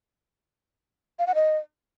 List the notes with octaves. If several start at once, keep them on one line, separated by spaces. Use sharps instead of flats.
F5
F#5
D#5